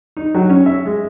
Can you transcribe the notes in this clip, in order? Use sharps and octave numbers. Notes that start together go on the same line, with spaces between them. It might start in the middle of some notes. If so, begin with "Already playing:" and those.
D#4
F#3
C#4
E5
G#3